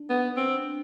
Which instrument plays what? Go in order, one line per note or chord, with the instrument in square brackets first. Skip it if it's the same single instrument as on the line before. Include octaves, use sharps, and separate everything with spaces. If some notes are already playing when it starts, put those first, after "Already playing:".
Already playing: [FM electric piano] D4
[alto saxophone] B3
C4